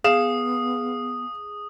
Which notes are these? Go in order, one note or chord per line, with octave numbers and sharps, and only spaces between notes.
B3 G#4 F5 D#6 E7